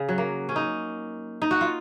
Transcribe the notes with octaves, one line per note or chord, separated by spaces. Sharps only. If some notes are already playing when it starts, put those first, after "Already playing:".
Already playing: C#3
F#3
A#3
C#4
D#4
D#4
F#4
F4